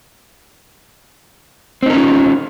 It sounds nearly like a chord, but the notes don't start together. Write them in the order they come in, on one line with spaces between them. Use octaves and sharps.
C4 D#4 A#4 C#4 F4